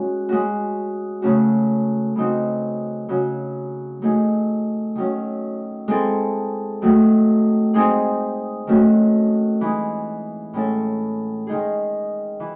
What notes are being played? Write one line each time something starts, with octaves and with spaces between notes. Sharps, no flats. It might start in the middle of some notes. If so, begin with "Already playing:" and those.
Already playing: G#3 C#4 F#4
G#3 C#4 F#4
C#3 F#3 A3 C#4 F#4
C#3 F#3 C4 D#4 F#4
C#3 F#3 C#4 F#4
F#3 A3 D#4 G#4
D#3 F#3 C#4
G#3 C4 E4 A4
D#3 F#3 A3
G#3 C4 D#4 G#4
D#3 F#3 A3 C#4 F#4
E3 G#3 D#4 G#4
A2 G#3 C#4 E4 A4
D#3 G#3 D#4 G#4
E3